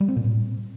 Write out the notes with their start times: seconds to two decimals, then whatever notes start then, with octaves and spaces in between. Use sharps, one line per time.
0.01 G3
0.08 C4
0.16 A#2
0.24 A2